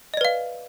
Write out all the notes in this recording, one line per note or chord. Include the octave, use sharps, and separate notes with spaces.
B4 D5 D#5 F5